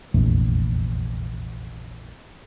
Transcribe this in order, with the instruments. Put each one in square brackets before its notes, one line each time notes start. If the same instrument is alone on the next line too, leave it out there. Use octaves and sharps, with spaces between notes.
[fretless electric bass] F1 A#1 E2